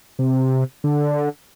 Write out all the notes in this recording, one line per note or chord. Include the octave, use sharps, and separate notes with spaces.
C3
D3